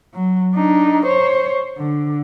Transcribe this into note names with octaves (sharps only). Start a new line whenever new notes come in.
F#3
D4 D#4
C5 C#5
D3